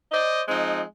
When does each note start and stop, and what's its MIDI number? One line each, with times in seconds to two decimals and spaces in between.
0.12 0.42 72
0.12 0.42 74
0.12 0.42 75
0.48 0.82 53
0.48 0.82 56
0.48 0.82 60
0.48 0.82 63